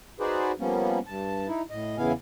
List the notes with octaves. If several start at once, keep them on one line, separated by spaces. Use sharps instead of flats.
D#4 F#4 G#4 B4 C5 D5
F3 G3 A#3 B3 C#4
G2 A5
D#4 E4
A2 D#5
E2 C#3 B3 E4 F5 G#5